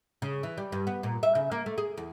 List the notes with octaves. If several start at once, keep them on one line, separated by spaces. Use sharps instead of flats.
C#3
E3
G3
G2
B3
A#2
E5
C#3
A#3
A3
G#4
E2